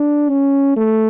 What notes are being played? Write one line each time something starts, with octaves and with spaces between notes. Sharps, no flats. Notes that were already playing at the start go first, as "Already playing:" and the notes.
Already playing: D4
C#4
A3